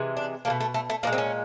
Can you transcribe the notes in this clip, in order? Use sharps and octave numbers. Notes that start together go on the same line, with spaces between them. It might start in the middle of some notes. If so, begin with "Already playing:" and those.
Already playing: C3 E3 G#3
D4
F#3 A3 A#3
B2
A3
A3
A3
A#2 F3 G#3 A#3
C4
C#4